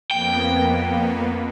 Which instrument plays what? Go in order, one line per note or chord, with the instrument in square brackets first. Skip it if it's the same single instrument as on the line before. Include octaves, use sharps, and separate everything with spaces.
[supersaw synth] F2 A#3 B3 [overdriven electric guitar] G5